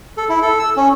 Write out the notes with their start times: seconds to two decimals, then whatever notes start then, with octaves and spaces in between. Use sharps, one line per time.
0.17 A4
0.29 E4
0.42 A4
0.59 E6
0.77 C#4